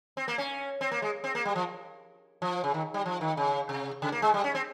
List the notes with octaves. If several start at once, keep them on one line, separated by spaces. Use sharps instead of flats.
C4
A#3
C#4
C4
A#3
G#3
C4
A#3
G3
F3
F3
C#3
D#3
G3
F3
D#3
C#3
C3
C#3
A#3
G#3
G3
C#4
C4